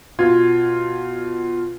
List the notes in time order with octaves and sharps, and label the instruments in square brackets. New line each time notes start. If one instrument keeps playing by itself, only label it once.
[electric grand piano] B2 F4 G#6